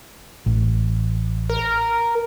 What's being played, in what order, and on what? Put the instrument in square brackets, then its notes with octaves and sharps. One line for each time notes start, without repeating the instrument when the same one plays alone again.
[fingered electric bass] A1
[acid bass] A#4